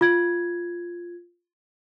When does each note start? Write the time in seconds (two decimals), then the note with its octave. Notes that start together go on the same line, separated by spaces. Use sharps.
0.01 F4 G#6